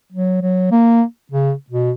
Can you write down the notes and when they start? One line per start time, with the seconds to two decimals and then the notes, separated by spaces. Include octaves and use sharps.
0.12 F#3
0.41 F#3
0.71 A#3
1.32 C#3
1.70 B2